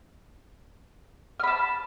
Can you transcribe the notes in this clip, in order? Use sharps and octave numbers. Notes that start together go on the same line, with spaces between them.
A5 B5 F6